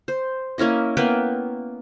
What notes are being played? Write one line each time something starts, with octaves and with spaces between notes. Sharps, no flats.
C5
A#3 C#4 E4 D#5
A#3 B3 B4 G5